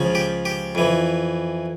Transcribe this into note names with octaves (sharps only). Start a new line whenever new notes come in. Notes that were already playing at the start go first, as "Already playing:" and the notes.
Already playing: C#2 C#3 F3
G4
G4
F2 E3